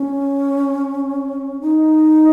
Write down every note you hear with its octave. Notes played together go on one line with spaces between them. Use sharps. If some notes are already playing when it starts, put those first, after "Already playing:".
Already playing: C#4
D#4